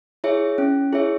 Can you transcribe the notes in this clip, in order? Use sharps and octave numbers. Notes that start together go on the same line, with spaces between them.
E4 G#4 C#5 E5
C#4
E4 G#4 C#5 E5